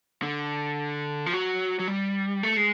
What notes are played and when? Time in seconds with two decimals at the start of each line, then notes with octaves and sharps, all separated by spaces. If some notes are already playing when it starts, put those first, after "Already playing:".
0.22 D3
1.26 F3
1.33 F#3
1.79 F#3
1.88 G3
2.43 A3
2.57 G#3